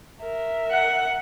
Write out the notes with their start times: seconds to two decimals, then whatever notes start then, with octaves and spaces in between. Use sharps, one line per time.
0.21 A#4 E5
0.71 F#5